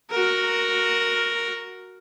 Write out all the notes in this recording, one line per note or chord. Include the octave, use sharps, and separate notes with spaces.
F#4 A#4